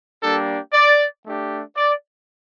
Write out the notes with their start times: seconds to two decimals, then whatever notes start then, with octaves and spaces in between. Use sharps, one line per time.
0.22 G3 A#3 D4 G4 A4
0.73 D5
1.25 A3 D4 G4
1.76 D5